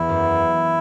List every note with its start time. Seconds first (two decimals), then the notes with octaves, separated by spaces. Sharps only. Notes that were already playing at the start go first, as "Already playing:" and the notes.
Already playing: E2 E3 B3 E4
0.09 F#2